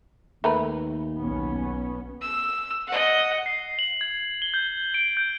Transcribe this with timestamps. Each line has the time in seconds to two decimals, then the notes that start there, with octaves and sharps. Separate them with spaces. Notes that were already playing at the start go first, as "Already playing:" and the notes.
0.44 D#2 A3 A#4 B4
1.20 B1 B3 C#4
2.21 E6
2.87 D#5 F#5
3.46 C7
3.79 F#7
4.01 G#6
4.42 G7
4.54 G6
4.94 D7
5.17 G6